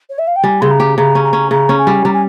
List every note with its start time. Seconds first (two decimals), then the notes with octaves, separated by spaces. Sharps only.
0.09 C#5
0.18 E5
0.27 F5
0.36 G5
0.44 G3 G#5
0.61 C#3 C6
0.70 A#5
0.80 G4
0.97 C#3 A#5
1.15 C#4
1.24 A#5
1.33 C#4
1.51 C#3 A#5
1.69 C#4
1.78 G#5
1.87 G3
2.05 G3 A#5
2.13 G#5